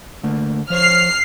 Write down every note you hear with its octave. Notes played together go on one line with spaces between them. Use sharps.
D3 A3 A#3
F3 C5 C#5 F6 C7